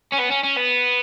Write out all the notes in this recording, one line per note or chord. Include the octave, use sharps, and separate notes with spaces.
C#4
B3
C#4
C#4
B3